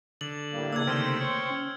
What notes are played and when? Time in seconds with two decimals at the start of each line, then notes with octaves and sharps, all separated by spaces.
0.21 D3 F#7
0.53 A2 G3 A#3
0.72 E2 A2 C#3 A#3 D4 E6 G#6
0.87 C3 D#3 A3 C5 G5 F6 G#6
1.21 C#5
1.51 C#4